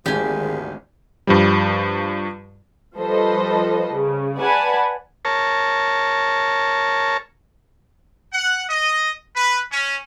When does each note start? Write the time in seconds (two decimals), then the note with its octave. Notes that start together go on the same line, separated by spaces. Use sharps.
0.06 G#1 D2 F3 A#3 G4 G#4 G#5
1.27 G2 F3 G3
2.96 F3 G3 A4 B4 C5 D#5
3.93 C#3
4.37 B4 D5 F#5 G#5 A5 B5
5.25 A#4 C#5 A5
8.32 F#5
8.69 D#5
9.34 B4
9.71 C#4